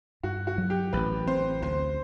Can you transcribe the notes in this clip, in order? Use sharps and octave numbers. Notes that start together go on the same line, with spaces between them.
G2 F#4
F#4
F#3
G4
A1 B4
C4 C5
D2 C5